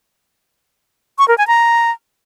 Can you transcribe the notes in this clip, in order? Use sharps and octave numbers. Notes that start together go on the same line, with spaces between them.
C#6
A#4
G#5
A#5